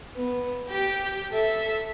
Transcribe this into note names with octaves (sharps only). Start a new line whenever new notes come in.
B3
G4 G5
A4 E5